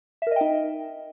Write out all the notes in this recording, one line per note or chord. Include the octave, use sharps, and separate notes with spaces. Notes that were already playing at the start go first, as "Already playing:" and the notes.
D#4 A#4 D#5 E5 G5